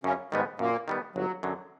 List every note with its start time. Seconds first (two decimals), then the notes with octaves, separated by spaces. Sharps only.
0.04 F#2 C#3 C#4
0.32 G#2 D#3 G3 G#3 B3
0.59 F#2 A#2 A#3
0.88 D#3 G3 B3
1.15 G1 F#3
1.43 F#2 D3 F#3